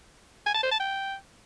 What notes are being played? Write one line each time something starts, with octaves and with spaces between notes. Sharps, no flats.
G#5
A5
C5
A5
G5